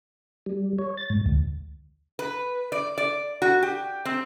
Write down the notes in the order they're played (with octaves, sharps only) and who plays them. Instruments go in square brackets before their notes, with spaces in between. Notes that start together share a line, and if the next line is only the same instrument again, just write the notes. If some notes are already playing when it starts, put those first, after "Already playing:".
[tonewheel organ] G3
C#5
A6
G#2
D2
[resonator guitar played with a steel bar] B4
D5
D5
F#4
G4
C4